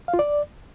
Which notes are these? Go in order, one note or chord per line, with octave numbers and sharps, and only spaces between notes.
F5
F4
D5